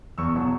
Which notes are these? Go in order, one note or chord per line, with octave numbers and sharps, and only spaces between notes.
E2 C#6 E6
B2 F#3